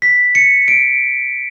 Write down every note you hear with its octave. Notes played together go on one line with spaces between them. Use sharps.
B6
C#7
D7